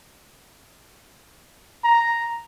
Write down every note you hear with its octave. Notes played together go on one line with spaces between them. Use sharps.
A#5